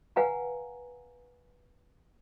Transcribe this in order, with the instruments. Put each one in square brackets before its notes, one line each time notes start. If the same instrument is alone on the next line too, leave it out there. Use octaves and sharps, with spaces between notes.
[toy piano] B4 F5 F#5 G#5 A#5